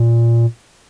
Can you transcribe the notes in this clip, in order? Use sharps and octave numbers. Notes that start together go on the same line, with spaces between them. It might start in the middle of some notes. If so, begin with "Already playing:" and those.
Already playing: A#2